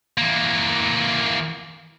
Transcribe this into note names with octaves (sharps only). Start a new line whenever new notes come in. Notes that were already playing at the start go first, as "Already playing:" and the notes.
E3 A#3